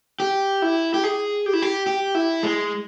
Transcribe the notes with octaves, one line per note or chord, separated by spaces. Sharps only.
G4
E4
G4
G#4
G4
E4
G4
G4
E4
G#3